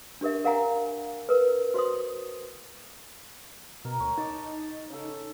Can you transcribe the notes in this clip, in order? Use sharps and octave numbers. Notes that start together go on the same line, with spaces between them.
D4 G4 A#4 E5
A#4 F5 F#5 G#5 A#5
A#4 B4
F#4 C5 C6 D#6
B2 A#4
D2 C#5
D#4 A5 D6
C#3 A4